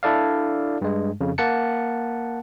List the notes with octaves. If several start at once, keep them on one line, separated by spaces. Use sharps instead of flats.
D4 E4 A4 D5 F5
G2 G#3
F2 C#3
A#3 F#5 A5 C#7